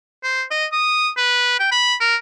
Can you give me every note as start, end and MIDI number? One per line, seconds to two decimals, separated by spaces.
0.23 0.44 72
0.51 0.66 75
0.73 1.10 87
1.17 1.56 71
1.60 1.71 79
1.72 1.95 83
2.01 2.16 70